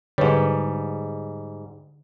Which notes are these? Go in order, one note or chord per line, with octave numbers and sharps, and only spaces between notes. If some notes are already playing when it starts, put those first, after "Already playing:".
G#2 D3 G3 B4 C#5